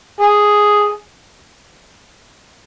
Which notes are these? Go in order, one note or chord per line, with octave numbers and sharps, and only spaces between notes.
G#4